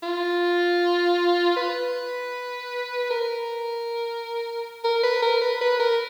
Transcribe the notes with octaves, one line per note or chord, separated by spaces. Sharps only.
F4
B4
A#4
A#4
B4
A#4
B4
B4
A#4